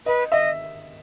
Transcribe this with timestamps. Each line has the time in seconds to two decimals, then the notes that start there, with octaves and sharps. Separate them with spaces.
0.06 B4 D#5
0.32 D#5 E5